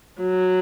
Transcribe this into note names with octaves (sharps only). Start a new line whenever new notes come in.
F#3